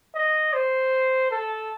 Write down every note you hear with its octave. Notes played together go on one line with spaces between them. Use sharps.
D#5
C5
A4